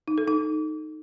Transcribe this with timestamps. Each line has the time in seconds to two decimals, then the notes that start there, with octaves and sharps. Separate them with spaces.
0.08 D#4
0.18 A4
0.28 D#4